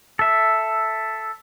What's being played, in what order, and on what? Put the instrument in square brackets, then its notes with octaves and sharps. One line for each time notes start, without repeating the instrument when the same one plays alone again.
[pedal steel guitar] A4 E5